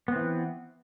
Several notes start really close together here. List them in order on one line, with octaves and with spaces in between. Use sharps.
B3 C4 E3